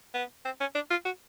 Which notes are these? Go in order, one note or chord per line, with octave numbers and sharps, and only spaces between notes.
B3
C4
C#4
D4
F4
F#4